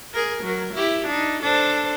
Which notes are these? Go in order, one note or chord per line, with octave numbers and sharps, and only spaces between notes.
G#4 A#4
F#3 A#4
E4 G4
D4 D#4
D4 A4 C5